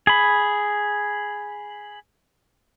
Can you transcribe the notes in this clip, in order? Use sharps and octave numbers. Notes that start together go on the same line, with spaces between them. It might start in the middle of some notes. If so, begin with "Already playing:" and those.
G#4 B5